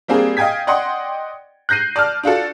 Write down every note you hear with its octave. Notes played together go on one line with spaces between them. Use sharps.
G3 A#3 C4 D4 G#4
D#5 F5 G5 G#5 G#6 B6
D5 D#5 F#5 G5 C6
F#6 G6 A#6 C7 D#7
D5 A5 F6
D4 F4 F#4 A4